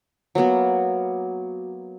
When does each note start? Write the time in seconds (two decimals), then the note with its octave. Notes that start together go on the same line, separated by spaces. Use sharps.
0.35 F#3 A#3 B3 F#4